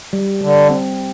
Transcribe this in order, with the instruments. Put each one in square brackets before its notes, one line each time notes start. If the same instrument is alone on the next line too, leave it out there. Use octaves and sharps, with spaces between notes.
[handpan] G3
[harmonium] D3 [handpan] G3
[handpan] C4